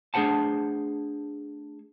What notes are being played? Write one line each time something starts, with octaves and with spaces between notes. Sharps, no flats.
A3 D4 G#4 C5 F#5 A5